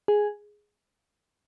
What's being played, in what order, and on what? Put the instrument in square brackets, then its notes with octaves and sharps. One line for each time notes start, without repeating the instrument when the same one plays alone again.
[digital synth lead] G#4